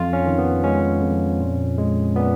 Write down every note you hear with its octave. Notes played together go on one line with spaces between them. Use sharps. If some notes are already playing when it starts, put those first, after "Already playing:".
Already playing: F2 F4
C#4
D#3
B3
G#3 C#4
F2
A#2
G#3
A#2 B3